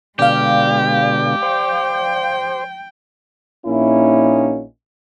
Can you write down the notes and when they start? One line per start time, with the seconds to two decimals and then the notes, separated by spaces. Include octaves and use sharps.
0.19 B2 D3 G#3 G4 D5 F5
1.42 C5 G5
3.66 A#1 A#2 A#3 C#4 D#4 E4